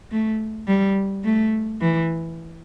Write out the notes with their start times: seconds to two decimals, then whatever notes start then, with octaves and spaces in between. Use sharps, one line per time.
0.11 A3
0.68 G3
1.24 A3
1.81 E3